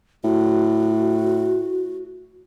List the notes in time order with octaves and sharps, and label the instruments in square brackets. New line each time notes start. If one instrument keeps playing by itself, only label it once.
[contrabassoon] A2 [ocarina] F#4